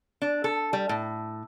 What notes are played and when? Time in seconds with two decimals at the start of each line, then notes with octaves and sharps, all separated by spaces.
0.22 D4
0.44 A4
0.73 G3
0.89 A2